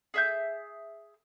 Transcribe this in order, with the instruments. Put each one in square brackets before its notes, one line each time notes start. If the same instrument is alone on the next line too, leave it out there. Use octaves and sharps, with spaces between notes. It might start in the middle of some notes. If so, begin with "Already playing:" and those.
[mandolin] G#4 E5 G6